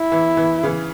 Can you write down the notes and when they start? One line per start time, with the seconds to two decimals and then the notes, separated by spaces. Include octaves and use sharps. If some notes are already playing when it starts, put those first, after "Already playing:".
Already playing: E4
0.12 E3
0.37 E3
0.63 C#3 E3